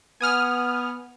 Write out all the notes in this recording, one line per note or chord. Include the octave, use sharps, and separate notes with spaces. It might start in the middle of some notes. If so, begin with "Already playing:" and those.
B3 G#5 D#6 F6